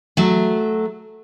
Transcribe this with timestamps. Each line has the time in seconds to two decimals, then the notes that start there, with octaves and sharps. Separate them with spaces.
0.17 F#3 A3